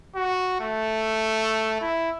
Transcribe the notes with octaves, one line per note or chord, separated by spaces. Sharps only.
F#4
A3
E4